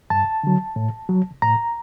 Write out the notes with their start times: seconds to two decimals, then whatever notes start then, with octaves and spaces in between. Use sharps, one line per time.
0.10 G2 A5
0.44 D3 F#3
0.76 A2
1.09 F#3
1.42 A2 A#5